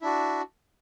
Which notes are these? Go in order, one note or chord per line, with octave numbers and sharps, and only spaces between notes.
D4 E4 F#4